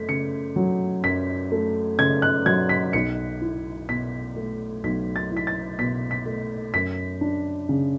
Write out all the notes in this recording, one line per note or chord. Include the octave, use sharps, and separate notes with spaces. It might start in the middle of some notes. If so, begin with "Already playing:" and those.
Already playing: F#2 A3 B6
C#3 C#7
F#3
F#2 B6
A3
C#3 G#6
F#6
F#3 G#6
B6
B1 C#7
E4
B2 B6
A3
B1 B6
A6
E4 B6
A6
B2 B6
B6
A3
F#2 B6
D4
C#3